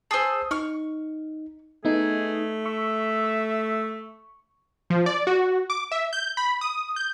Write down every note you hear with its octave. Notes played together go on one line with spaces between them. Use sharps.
G#4 C5 A5 D#6 E6
D#4 C#6 F6
A3 B3 D#4 G#4
E5 C#6
F3
D5
F#4
D6
E5
G6
B5
D#6
G6